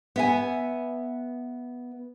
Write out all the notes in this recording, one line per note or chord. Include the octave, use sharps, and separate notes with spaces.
B3 E5 G#5